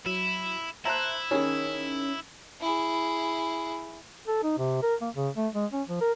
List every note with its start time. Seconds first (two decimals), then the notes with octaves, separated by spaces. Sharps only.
0.06 F#3 E4
0.85 E4 C5 E5 A5 A#5 F#6
1.31 D#3 C#4 G#4
2.61 E4 G#4
4.27 A4
4.43 D#4
4.58 C3
4.82 A#4
5.01 A#3
5.14 C#3
5.36 A3
5.54 G#3
5.73 C#4
5.89 F3
6.01 A#4